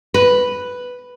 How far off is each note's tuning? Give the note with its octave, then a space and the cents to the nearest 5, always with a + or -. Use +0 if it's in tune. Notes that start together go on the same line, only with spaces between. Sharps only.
B4 +0